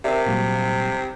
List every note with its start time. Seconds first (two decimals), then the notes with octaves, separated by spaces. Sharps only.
0.04 C3 A#4 D5 E5
0.26 A#2 F#3 G3